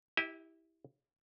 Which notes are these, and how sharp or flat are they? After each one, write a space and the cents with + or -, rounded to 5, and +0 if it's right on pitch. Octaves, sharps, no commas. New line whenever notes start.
E4 -15 G4 +0 D#5 +40